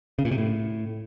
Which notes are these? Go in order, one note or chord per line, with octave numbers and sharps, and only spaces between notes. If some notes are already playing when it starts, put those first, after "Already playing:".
C#3
A#2
C3
A2